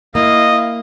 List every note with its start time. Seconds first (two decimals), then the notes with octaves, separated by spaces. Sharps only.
0.15 A#3 E4 D#5 F5